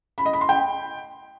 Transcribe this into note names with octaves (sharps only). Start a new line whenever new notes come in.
B5
D#5
B5
C6
G5